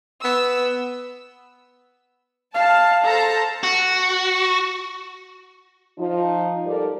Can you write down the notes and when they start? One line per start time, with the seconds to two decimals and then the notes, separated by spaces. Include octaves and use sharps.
0.24 B3 E6
2.55 F5 A5
3.05 A4 C5 A5 A#5
3.63 F#4
5.98 F3 D#4
6.65 G#2 G3 A4 A#4 D5